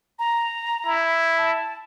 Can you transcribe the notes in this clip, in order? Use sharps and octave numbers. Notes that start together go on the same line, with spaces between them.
A#5
E4
A5